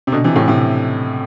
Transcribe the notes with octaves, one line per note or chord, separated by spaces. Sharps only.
C3
B2 D3
C3 E3
A2 C3
A2 C3